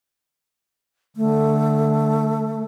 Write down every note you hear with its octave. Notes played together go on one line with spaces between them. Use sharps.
D3 A3